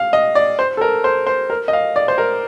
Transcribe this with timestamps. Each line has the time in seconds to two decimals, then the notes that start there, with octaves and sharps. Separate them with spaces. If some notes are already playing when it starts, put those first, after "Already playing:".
Already playing: F5
0.13 D#5
0.35 D5
0.59 C5
0.77 A4
0.81 A#4
1.04 C5
1.27 C5
1.50 A#4
1.68 D#5
1.73 F5
1.96 D5
2.08 C5
2.18 A#4